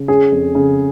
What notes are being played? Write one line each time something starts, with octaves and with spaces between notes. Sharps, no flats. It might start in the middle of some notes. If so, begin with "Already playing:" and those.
Already playing: C#3
C#4 G#4 G#5
F2
C#3